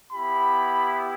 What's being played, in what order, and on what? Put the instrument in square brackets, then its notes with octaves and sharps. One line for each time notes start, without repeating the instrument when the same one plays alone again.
[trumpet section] B3 E4 G4 B5